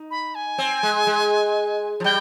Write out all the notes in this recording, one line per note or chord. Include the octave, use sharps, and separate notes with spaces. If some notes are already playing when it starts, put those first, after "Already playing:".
Already playing: D#4
B5
G#5
C4
G#3
G#3
F3
G3 G5